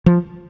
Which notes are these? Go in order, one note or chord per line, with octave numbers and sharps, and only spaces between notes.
F3